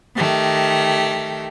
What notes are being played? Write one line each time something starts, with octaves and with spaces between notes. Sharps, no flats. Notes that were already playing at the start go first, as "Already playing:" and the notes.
D#3 A3 G4